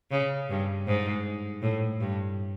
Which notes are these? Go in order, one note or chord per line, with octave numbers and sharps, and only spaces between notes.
C#3
G2
G#2
A2
G2